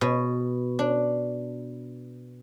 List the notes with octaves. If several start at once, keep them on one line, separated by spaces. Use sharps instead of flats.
B2
D4